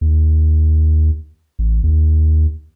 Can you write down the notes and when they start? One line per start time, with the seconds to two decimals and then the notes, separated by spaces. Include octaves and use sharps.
0.01 D#2
1.59 A1
1.83 D#2